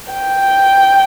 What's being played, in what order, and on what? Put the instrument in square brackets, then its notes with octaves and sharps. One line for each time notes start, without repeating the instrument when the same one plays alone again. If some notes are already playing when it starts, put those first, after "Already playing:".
[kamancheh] G5